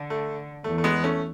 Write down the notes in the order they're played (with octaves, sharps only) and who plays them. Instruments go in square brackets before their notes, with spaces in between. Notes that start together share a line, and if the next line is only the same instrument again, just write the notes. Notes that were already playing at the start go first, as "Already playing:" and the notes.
Already playing: [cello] D3
[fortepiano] A3
[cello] E2 [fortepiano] A3
[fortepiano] A3
G#3 B3
A3 C#4